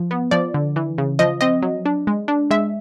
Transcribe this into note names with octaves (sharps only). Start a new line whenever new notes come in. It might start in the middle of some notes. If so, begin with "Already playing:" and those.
Already playing: F3
B3
F3 D5
D3
E3
C#3
F3 D#5
C4 D#5
F#3
D4
G#3
D4
G#3 E5